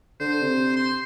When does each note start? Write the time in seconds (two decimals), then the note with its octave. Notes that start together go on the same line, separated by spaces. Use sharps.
0.20 D3 C5
0.41 C3
0.76 C6